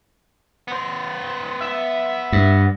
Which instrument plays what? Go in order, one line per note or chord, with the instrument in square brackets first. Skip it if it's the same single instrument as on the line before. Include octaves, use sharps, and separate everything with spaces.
[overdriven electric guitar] B3 C5
[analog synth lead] E5
[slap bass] G2